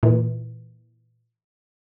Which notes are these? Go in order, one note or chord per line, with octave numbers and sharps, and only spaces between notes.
A#2 E3